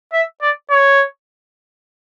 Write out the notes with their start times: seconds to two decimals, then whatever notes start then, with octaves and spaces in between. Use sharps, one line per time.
0.13 E5
0.41 D5
0.70 C#5